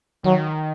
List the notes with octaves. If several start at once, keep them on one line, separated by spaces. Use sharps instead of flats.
D#3 F#3